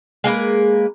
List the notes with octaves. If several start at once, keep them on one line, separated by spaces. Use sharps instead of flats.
G#3 A#3 A#4 B4